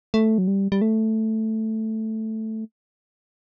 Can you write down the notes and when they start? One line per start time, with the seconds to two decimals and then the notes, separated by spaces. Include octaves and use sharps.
0.14 A3
0.38 F#3
0.48 G3
0.72 G3
0.81 A3